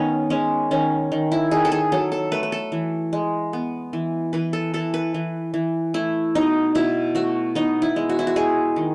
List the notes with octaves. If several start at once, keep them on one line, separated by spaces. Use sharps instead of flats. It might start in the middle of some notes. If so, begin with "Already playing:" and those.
Already playing: D#3 B3 C#4 D#4
G#3 C#4
D#3 C#4
D#3
E4
D#3 G#4
A4
G#4
F#3 A4
A4
A3 B4
B4
A4
E3
G#3
B3
E3
E3 B4
A4
E3 A4
B4
E3
E3
A3 E4
B2 D#4
B2 E4
A3 F#4
B3 D#4
E4
G#3
F#4
E4
F#4
G#3 G#4
D#3